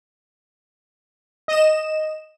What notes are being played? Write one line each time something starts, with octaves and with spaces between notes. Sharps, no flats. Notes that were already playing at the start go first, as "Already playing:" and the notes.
D#5 E7